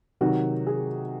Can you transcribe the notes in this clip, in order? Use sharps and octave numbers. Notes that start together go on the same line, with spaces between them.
C3 D#3 F#3 F#4
G#4